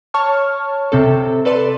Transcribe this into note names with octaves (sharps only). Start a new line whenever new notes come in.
C#5 A5 C#6 F6
C3 C4 A4
A4 B4 D5 C6